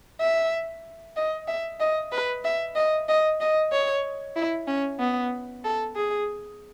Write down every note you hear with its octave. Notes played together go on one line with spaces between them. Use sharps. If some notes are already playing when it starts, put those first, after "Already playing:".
E5
D#5
E5
D#5
B4
E5
D#5
D#5
D#5
C#5
E4
C#4
B3
A4
G#4